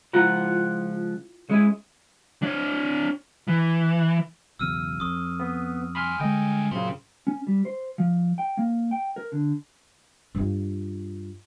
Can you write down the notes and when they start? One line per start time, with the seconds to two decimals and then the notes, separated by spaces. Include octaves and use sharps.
0.13 C#2 F3 E4 F4 F#5
1.50 G#3 C#4 E4 G#5
2.42 D4 C#5
3.48 E3
4.59 B1 E2 C#3 E6 F6 D#7
5.00 F2 C#6 D#6
5.39 B3
5.95 G2 G#5 B5 C6 F6
6.19 D3 G#3 D#5 G5
6.71 F#2 A#2 C#3 G4 C5
7.27 C#4
7.47 G3
7.65 C5
7.98 F3
8.38 G5
8.57 A#3
8.91 G5
9.16 A#4
9.32 D3
10.35 G2 F4